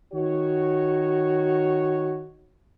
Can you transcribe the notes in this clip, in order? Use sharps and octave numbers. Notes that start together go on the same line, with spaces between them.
D#3 F#4 C#5